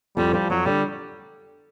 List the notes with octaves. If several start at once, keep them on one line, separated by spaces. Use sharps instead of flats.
F2 G3
F3 G3
F2 F#3
D3 G3